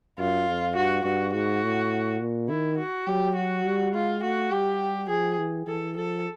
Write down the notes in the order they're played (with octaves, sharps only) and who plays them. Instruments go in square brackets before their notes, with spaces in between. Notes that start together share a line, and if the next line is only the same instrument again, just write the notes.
[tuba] F#2 [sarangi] F4
[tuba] F2
[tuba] G2 [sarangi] F#4
[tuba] G2 [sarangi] F#4
[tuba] G#2 [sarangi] F#4
[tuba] A2
A#2
[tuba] D#3 [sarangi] E4
[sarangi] F#4
[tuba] F#3 [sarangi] G4
[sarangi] F#4
[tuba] G3
[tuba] G#3 [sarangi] F4
[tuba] A3 [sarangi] F#4
[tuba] G3 [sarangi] G4
[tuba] F3 [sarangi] G#4
[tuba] E3
[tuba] E3 [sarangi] A4
[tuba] F3 [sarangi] A4